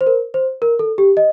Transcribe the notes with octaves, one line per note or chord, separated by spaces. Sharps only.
C5
A#4
C5
A#4
A4
G4
D#5